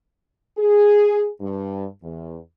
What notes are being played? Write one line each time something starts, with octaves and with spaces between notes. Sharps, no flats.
G#4
G2
E2